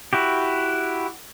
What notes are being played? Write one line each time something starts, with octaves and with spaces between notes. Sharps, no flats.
E4 F#4 G4